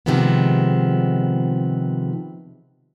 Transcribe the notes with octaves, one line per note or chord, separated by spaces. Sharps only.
C3 D#3 F3 G#3 B3